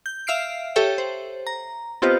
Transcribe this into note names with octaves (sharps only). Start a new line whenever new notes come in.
G6
E5 F5 F6 C7 D7
G4 A4 C#5 E5 G5
C5
A#5
B3 C4 F4 G4 C5 D#5